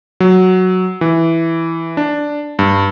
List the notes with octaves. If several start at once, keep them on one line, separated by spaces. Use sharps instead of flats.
F#3
E3
D4
G2